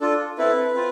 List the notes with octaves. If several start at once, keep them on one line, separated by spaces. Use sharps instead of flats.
D4 F4 A4
C4 E4 A4 B4
C4 F4